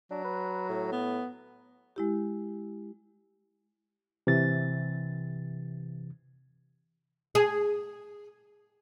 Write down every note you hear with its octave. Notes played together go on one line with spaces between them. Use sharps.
F#3 D4
B4
A2
B3
G#3 E4 G4
C3 E3 A6
G#4